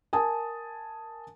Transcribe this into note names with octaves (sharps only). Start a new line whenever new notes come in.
A#4 G#5 A5 D#6